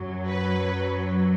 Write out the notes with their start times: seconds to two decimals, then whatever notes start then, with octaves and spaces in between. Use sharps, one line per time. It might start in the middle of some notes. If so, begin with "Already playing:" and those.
Already playing: F#2 F#3
0.26 B4